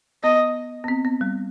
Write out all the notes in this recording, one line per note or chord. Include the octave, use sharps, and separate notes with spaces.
B3 D#5
B3
C4
B3
G3